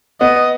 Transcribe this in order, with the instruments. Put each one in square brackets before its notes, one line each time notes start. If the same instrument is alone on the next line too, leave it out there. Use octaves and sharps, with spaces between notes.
[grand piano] B3 [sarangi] D#5